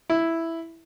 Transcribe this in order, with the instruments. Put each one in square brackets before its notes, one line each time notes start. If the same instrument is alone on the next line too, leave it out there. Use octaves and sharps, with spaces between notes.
[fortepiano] E4